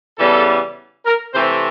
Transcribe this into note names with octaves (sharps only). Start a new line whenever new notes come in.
C#3 E3 G3 B3 A4
A#4
C3 E3 A3 C4 C5